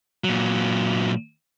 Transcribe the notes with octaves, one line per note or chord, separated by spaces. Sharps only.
A#2 F#3